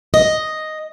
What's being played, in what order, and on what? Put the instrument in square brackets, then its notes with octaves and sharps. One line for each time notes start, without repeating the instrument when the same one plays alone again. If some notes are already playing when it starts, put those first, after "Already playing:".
[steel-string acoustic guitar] D#5